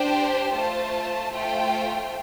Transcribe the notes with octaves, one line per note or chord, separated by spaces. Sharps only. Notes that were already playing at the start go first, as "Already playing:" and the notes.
Already playing: D4 G4 C5 G5
A3 F4 C5 A5
A3 F4 C5 G5